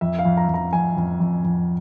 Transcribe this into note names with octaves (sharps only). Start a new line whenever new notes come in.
F2 E5
F5
F2
A#5
F2
A#5
F2 G#5
F2
F2
F2